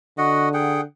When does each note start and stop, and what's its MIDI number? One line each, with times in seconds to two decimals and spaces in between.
0.18 0.84 50
0.18 0.49 66
0.18 0.49 75
0.18 0.49 78
0.54 0.81 68
0.54 0.81 78
0.54 0.81 79